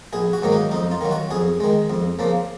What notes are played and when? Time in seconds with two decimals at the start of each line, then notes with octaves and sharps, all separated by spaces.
0.13 A#1 G#4
0.33 F#4
0.43 G#2 D#3 F#3 A#3
0.52 D#4
0.71 F2 D#4
0.91 F4
1.01 D#3 F#3
1.11 F#4
1.31 F2 G#4
1.60 D#3 G#3
1.90 F2
2.19 C#3 F3 A#3